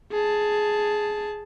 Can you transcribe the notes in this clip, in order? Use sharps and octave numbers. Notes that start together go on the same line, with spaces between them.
G#4 A5